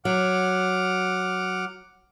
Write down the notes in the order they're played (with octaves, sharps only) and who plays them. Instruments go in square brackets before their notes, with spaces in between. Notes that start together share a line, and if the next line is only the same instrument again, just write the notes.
[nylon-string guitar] F#3 [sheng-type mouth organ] F#5 D6 F6